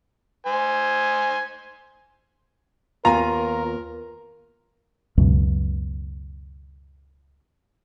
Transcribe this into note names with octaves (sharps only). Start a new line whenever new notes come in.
C5 G#5
D#2 B3 F4 A#4 G#5 A#5
C#2 F#2 B2